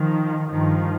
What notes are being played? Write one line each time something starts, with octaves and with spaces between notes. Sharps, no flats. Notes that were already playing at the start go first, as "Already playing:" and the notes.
Already playing: D#3 F3
G2 D#3 F3